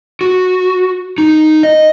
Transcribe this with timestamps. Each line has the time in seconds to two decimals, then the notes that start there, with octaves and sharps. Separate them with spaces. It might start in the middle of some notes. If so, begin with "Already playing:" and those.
0.21 F#4
1.18 D#4
1.63 D#5